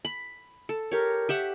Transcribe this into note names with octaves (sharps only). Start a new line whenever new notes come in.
B5
A4
G4 A#4 C#5
G4 E5 F#5